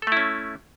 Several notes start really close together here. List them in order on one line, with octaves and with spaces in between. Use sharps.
A4 A3 E4 C#4